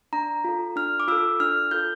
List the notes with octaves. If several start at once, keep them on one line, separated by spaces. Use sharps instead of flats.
D4 A#5
F4 A4
D4 F6
D6
F4 A4 E6
D4 F6
F4 A4 G6